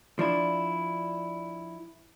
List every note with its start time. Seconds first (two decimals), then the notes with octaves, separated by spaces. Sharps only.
0.19 F3 D4 E4